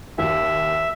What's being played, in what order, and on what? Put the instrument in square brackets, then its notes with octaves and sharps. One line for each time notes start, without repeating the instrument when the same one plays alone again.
[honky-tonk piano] D#2 [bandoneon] E5